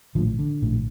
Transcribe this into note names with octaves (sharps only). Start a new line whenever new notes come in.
A#1 A2 D3 F3
D3
A#1 A2